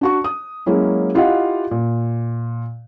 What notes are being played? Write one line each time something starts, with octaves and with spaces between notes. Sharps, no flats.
D4 F#4 C#6
D#6
F#3 G#3 A#3 C#4 E4
E4 F4 G4 D#5 F5 F#5
A#2